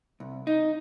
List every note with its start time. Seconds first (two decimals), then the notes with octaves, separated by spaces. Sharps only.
0.20 C2
0.47 D#4